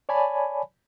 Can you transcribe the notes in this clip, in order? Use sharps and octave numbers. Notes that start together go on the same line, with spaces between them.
C#5 D5 G#5 A5 B5